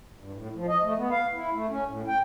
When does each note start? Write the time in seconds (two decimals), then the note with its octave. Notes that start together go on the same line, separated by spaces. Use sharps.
0.19 G2
0.33 A2
0.55 F3
0.68 D#5
0.84 A3
0.97 B3
1.11 F5
1.33 E4
1.53 A3
1.70 C#4
1.86 A2
2.08 G5